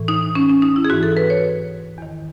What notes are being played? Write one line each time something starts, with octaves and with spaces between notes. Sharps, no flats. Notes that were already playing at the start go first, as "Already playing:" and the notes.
Already playing: A2 E3
D#4
C#4
C#4
D#4
E4
G#4
G#2 E3 F#4
A4
B4
C#5
E2 D#3